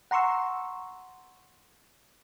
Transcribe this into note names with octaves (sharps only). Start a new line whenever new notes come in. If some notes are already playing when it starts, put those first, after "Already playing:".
F#5 A#5 C6 C#6 E6